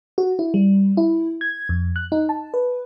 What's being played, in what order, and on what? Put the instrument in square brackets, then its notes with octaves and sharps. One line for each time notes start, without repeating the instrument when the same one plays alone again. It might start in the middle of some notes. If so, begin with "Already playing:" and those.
[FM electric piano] F#4
E4
G3
E4
G#6
F2
F#6
D#4
A5
B4